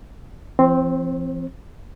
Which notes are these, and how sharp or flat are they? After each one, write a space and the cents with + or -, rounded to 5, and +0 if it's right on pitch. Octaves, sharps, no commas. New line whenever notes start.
F3 -45 C4 +0 C5 +45